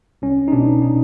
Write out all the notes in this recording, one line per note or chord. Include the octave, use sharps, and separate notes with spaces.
C2 C#4
D#4
B2 D4
D#4